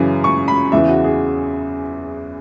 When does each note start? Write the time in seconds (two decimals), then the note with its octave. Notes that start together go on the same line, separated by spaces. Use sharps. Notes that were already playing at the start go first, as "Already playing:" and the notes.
Already playing: F#2 C#3 E3
0.24 C#6
0.48 B5
0.72 E2 C#3 E3 E5
0.88 F#4
1.04 G#4